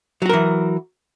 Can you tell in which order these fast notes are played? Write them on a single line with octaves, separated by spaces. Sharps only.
F#3 F#4 A#4 E3